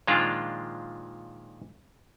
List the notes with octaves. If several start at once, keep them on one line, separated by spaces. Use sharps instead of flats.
A#2 D#3 F3 G#3 D4 F4